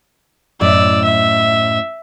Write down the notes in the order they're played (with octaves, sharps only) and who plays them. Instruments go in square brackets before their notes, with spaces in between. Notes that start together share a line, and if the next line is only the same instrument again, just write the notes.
[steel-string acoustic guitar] F#2 A2 D#5 [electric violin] D5 E6
[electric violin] E5